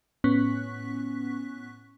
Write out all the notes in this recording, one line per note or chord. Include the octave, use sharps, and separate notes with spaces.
A2 B3 C#4 C#6 F#6 B6